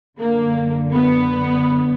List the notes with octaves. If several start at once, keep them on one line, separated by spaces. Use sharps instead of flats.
F#2 D3 A#3
B3